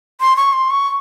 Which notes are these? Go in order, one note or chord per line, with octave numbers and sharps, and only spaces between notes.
C6
C#6
C6
C#6